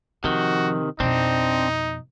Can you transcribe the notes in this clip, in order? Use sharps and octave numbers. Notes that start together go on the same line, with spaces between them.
C3 D#3 F3 F#4
F2 B2 C4 D4 D#4